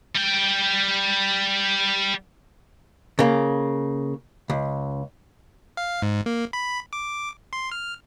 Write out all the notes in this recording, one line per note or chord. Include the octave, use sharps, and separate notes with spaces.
G3 G5
C#3 A#3
C#2
F5
G#2
A#3
B5
D6
C6
F6